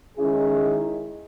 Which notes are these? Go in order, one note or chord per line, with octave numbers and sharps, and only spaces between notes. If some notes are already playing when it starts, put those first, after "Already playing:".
D#3 G#3 C#4 E4 G#4